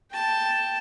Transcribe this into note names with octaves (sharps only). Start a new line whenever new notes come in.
G5 A5